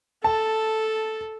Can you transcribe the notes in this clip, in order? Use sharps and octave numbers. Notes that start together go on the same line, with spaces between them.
A4 A5